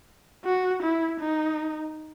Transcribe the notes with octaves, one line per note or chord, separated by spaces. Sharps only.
F#4
E4
D#4